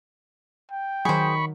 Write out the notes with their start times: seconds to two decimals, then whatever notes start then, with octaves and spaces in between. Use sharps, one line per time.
0.72 G5
1.05 D#3 F#3 G#4 C5 B5 C#6